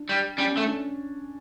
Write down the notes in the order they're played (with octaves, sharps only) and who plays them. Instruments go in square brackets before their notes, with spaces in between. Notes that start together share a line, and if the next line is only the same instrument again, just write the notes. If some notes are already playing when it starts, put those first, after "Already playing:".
Already playing: [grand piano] D4
[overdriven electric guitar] G3
[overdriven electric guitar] G3 [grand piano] C#4
[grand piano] C#4
[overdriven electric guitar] A3
[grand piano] D4